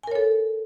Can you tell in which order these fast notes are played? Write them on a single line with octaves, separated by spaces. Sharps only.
G#5 A#4 C#5 A4